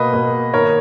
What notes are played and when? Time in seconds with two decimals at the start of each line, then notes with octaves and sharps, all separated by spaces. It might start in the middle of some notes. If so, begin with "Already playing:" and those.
Already playing: B2 A#3 B4 D#5
0.12 B2 A#3
0.53 D#3 A#3 A#4 C#5